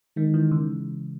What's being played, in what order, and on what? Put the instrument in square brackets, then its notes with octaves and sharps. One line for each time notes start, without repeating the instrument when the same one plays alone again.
[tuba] D#3 [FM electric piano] G#3
[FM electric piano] E3
C#3